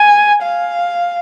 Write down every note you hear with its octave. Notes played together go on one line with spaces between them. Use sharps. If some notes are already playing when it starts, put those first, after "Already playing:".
Already playing: G#5
F5